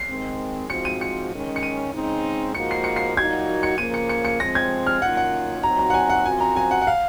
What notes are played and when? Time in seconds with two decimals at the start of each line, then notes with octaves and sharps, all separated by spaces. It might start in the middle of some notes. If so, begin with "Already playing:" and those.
Already playing: C7
0.09 D#3 G#3 C4
0.70 G#2 F3 C4 F#4 C#7
0.85 D#7
1.01 C#7
1.32 D#3 G#3 C#4
1.56 C#7
1.63 D#7
1.93 C#3 G#3 C4 D#4
2.55 G#2 F3 A#3 D#4 F#4 C#7
2.71 C7
2.84 C#7
2.96 C7
3.17 A#2 F#3 A#3 D#4 F#4 G#6
3.63 C#7
3.78 C#3 F3 A#3 D#7
3.94 C#7
4.09 C#7
4.25 C#7
4.40 F3 G#3 C4 A#6
4.55 G#6
4.87 F6
5.02 F#2 D#3 A#3 C#4 F4 F#5
5.17 F#5
5.63 A#2 F#3 C4 D#4 F#4 A#5
5.79 A#5
5.90 F#5
5.94 G#5
6.10 F#5
6.25 F#2 F3 C4 F#4 G#5
6.40 A#5
6.56 G#5
6.71 F#5
6.81 F#5
6.87 F5